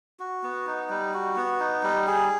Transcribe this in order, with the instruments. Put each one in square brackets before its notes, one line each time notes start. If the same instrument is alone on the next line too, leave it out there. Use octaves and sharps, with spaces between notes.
[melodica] F#4
B3
D#4
G3
F#4
B3
D#4
G3
G#4